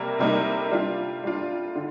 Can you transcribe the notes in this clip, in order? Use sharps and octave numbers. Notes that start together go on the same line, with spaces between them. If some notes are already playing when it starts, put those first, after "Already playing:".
Already playing: C3 G3 A#3
C3 G3 A#3 D#4
G3 D4 F4
G3 D4 F4
D3